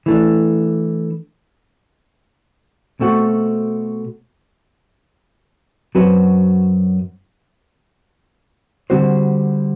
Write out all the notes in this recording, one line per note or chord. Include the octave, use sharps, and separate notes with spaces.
E3 A3 D4
B2 A3 C4 F#4
F#2 F#3 C4 F#4 B4
D3 G3 C4 F#4 C5